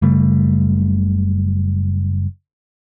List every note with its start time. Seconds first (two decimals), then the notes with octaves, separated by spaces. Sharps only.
0.02 F#1 C#3 G3 A3